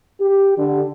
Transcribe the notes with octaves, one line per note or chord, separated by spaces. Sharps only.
G4
D3